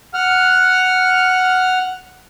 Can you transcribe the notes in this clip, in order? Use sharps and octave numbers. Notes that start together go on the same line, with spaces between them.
F#5 F6